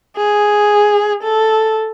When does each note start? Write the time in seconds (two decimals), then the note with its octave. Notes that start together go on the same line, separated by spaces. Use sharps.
0.17 G#4
1.23 A4